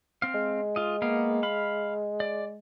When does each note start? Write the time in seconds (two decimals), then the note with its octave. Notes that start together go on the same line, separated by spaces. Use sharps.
0.22 C4 F5
0.35 G#3
0.76 F4 D#5
1.02 A#3 B3 F5
1.43 F5 B5
2.20 D5